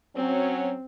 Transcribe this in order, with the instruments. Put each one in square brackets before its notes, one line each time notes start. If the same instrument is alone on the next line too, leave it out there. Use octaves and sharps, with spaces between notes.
[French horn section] F#3 C#4 [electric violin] C4